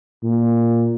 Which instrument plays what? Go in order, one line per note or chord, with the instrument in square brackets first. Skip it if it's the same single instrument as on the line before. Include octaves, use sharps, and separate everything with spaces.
[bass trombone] A#2